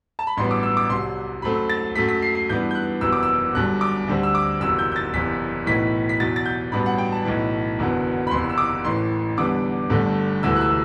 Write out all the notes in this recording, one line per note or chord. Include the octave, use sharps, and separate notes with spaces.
A5
B5
A1 G2 F#3 B3 C6
D6
E6
D6
C2 C3 F#3 C6
F#2 F#3 A3 C4 B5
A6
F#2 F#3 A3 B6
B6
C7
C7
G2 E3 B3 D4 G6
G6
F#6
F#1 E2 C3 F#3 B3 E6
D6
E6
G1 G2 F#3 F#6
D6
D2 D3 G3 C4
E6
D6
F#1 E2 C3 F#3 E6
G6
G6
A6
F#1 E2 C3 B6
B1 A2 E3 B6
B6
E2 B2 F#3 A6
A6
G6
A1 G2 F#3 B3 B5
F#5
G5
A5
B1 A2 E3
F#1 E2 D3 F#3 B3
B5
F#1 E2 C3 C6
E6
D6
A1 A2 E3 C6
E2 D3 G3 B3 D4 D6
G1 G2 D3 A3
E1 D2 C3 E3 A3 E6
F#6
E6